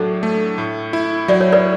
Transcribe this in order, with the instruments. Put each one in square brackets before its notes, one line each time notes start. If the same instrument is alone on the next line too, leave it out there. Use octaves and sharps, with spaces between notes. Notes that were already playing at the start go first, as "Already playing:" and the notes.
Already playing: [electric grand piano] A2 F#3 D4 [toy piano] A4
[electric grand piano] A3
A2
E4
[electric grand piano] F#3 [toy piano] D5
[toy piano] C#5
B4 D5